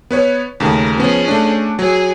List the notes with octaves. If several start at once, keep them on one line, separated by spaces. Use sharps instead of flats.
B3 B4 C#5
D#2 C#3 A3 A#4
F3 B3 C#4 G#4
A3 D4
F#3 G#4 G#5